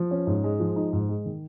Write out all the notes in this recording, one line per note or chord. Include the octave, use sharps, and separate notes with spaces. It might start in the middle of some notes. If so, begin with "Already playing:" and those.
Already playing: F3
C#4
G#2
G#3
F3
D#4
G#2
G#3
D#3